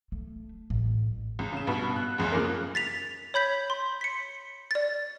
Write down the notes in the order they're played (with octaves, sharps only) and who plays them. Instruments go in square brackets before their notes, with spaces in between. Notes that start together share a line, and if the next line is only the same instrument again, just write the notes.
[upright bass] A3
A1
[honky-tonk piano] C#2
C#3 E7
G2 B2 B4
F#6
F#1 C#2 F#2
C#3 F3 A#3 A#4 F#6
[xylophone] A6 B6 F7
C#5 B5 G6 B6
C6
B6 C#7
D5 A6